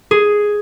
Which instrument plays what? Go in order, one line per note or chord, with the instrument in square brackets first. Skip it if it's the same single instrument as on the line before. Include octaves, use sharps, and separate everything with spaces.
[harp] G#4